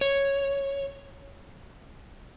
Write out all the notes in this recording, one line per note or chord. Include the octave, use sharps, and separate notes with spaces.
C#5